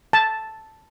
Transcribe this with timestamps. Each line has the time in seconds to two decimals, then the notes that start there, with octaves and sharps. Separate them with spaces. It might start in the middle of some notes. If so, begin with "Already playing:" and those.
0.13 A5